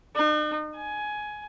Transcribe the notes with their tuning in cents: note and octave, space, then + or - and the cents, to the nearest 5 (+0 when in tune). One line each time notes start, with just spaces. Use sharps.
D#4 -45
G#5 +15